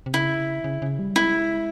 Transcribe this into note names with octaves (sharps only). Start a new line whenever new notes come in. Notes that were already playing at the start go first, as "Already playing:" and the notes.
C3
C#3 E4
C#3
C#3
G3
G#3 E4